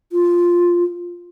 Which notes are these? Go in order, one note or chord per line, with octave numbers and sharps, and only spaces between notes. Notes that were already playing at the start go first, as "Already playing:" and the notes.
F4